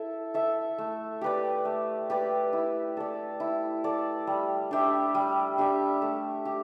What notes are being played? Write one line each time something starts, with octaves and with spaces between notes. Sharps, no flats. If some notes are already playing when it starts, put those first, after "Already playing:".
Already playing: E4 A4 E5
A4 E5
A3
G4 B4 D5
A3
G4 B4 D5
E4
A4 D5
E4
A4 D5
G3
D4 G4 E5
G3
D4 G4 E5
A3
G4